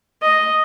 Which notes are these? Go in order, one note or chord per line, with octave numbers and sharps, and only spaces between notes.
D#5